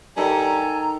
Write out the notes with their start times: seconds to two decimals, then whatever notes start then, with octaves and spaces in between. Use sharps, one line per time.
0.17 G2 D#3 G3 A4 G#5 A#5